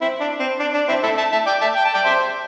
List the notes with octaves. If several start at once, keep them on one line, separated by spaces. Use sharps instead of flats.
C4 E4
D4
C4
D4
D4
C4 E4
E4 A4
E5 A5
E5 A5
D5 G5
E5 A5
G5
A5
D5 G5
C5 E5